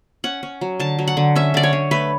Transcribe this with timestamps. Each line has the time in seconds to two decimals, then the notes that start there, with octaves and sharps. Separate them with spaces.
0.24 C#4 F#5
0.43 C#4
0.61 F#3
0.80 D3 A5
0.99 F#3
1.08 F#5
1.17 D3
1.36 C#4 E5
1.54 D3 D5
1.63 C#5
1.73 D3
1.91 A3 B4